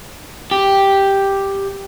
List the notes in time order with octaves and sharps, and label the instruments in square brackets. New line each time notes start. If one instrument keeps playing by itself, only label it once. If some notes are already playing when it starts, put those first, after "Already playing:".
[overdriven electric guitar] G4